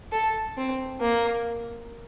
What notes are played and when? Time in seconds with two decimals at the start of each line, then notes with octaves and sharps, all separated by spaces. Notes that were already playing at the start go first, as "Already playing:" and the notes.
0.12 A4
0.57 C4
1.01 A#3